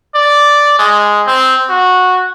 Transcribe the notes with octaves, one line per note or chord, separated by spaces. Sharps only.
D5
G#3
C4
F#4